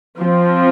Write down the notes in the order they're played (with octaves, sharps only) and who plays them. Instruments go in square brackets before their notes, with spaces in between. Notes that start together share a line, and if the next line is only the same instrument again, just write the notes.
[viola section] F3 C4